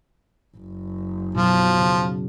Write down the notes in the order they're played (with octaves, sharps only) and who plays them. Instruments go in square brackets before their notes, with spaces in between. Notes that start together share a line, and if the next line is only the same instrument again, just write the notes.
[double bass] F#1
[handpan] B2 F#3 [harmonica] F3
[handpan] C#3